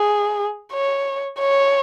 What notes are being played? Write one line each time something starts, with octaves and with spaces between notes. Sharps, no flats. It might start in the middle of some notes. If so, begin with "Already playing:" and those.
Already playing: G#4
C#5
C#5